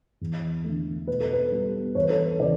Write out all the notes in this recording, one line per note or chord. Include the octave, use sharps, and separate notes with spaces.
E2
D3 A3
B2 B4
A4
B4
G3 B3
E2 C#5
B4
A4
B4
C#3 E3 D5